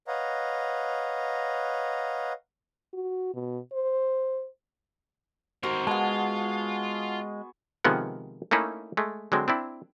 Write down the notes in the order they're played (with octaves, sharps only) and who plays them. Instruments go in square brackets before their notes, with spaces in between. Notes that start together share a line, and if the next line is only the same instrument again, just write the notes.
[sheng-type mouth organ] B4 C#5 D#5 F5 F#5 A#5
[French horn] F#4
B2
C5
[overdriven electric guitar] C4 D#4 [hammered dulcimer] F#4 A#4 C5
[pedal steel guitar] G#3 [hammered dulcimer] B3 G#4 [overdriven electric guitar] F4 [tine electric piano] F#5 A5
[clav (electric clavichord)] C3 D#3 F3 G#3 B3 F#5
A3 A#3 C#4 D#4 E4
G#3 A3
D3 F#3 G#3 C4
C4 D4 E4